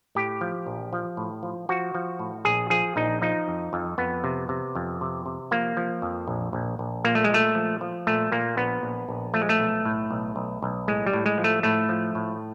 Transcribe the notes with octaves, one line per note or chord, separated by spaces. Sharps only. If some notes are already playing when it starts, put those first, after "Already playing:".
A2 G4
F3
A#1
F3
A2
F3
F3 F#4
F3
A2
A#1 G#4
F3 G#4
A#1 D#4
F3 D#4
F2
F2
F2 B3
C3
C3
F2
C3
C3
F3 A#3
F3
F2
A#1
A#1
A#1
A#2 A#3
A3
G#3
A#2 A3
F3
F3
A#2 A3
A#2 A#3
A#1 B3
A#1
A#1
F3 A3
G#3
A3
B1
A2
B1
B1
B1
A2 G#3
G3
A2
G#3
F3
A3
A2 A3
F3
A2